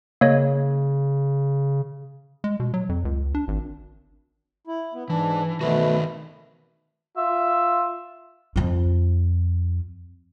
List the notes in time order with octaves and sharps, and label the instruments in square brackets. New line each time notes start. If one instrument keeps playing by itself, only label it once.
[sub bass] C#3 [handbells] A#3 C#5 D#5
[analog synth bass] G#3
B2
F#3
F2
C#2
D4
G#1
[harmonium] E4
B3
[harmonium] G#2 D4 [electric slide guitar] E3
[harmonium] B2 A3 B4 [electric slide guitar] D#3 F#4
[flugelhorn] F4 [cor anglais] E5
[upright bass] F2 F4